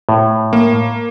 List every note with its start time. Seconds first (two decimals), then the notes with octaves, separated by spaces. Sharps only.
0.09 A2
0.53 A#3